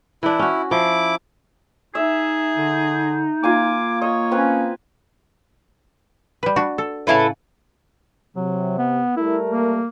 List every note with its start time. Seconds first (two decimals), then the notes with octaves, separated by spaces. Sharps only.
0.23 E3 D4 E4
0.39 C#4 F#4
0.71 F3 E4 D6
1.95 D#4 G#4 E5
2.57 D3
3.44 A#3 F4 G#5 D6
4.01 C#5 D#5
4.31 C4 C#4 B4
6.43 G3 B4
6.56 D4 F#4
6.78 A4
7.07 A2 C#3 E4 A4 B4 F5
8.36 C3 F#3
8.78 B3
9.17 G3 A3 E4 A#4
9.50 A#3